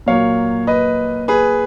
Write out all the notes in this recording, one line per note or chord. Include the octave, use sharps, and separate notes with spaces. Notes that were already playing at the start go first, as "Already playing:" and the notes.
A#2 F#3 A#3 C#5 F5
B4 D#5
G#4 B4